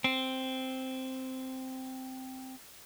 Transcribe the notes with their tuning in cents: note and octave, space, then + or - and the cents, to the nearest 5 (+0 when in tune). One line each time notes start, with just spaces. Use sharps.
C4 -5